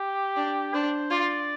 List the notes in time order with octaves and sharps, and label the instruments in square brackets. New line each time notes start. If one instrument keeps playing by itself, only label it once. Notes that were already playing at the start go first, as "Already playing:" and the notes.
Already playing: [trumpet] G4
[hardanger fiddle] D4
[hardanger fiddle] D4 [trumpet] C5
[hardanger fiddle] F4 [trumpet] D5